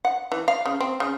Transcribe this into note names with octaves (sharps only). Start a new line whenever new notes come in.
F#5
E3
F5
C#3
C4
C#3